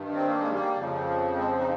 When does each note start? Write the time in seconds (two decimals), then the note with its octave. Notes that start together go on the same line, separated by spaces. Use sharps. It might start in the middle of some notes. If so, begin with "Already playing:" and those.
Already playing: G2 D#3
0.14 C4
0.27 A#3
0.39 G#3
0.52 G3 A#3
0.75 F2 C#3 F3
1.37 G#3 C4
1.59 D#4